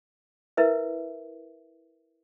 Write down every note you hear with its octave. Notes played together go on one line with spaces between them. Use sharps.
E4 A#4 B4 E5